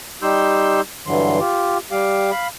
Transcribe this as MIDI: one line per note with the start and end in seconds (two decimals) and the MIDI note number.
0.23 0.81 55
0.23 0.81 63
0.23 0.81 67
0.23 0.81 84
0.23 0.81 88
0.23 0.81 91
1.06 1.39 43
1.06 1.39 50
1.06 1.39 52
1.06 1.39 54
1.06 1.39 84
1.40 1.78 65
1.40 1.78 67
1.91 2.31 55
1.91 2.31 67
1.91 2.31 77
1.91 2.31 86
2.32 2.48 77
2.32 2.48 83